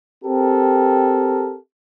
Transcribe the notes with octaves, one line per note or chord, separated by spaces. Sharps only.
C4 G4 A4 A#4